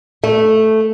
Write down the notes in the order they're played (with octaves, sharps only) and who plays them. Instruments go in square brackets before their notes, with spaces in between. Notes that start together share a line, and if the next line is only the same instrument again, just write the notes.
[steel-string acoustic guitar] A3